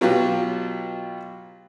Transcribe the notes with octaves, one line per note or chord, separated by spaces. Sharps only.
B2 F#3 F4 G4 B4